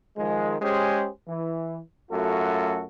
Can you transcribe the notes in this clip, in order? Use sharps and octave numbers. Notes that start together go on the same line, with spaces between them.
D#3 F3 G#3
G#3 C#4 G4 G#4 C5
E3
F#2 A3 F4 F#4 A4